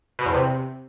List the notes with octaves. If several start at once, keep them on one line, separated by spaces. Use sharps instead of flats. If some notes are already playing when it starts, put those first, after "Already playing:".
B2
E2
C3